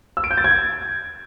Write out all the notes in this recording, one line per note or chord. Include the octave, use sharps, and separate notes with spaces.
E6
D7
G6
A6
G#6